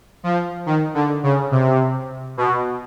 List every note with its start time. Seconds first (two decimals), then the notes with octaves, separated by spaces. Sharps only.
0.24 F3
0.66 D#3
0.94 D3
1.23 C#3
1.51 C3
2.37 B2